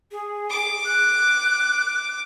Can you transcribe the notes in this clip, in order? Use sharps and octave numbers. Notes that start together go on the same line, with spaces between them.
G#4
D6
F#6